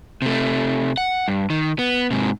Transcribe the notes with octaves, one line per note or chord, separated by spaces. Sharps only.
C3 A3
F#5
G2
D#3
B3
G#2 C3